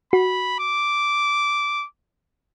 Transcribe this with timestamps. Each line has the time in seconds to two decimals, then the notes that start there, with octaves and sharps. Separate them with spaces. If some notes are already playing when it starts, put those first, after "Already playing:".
0.13 F#4 B5
0.60 D6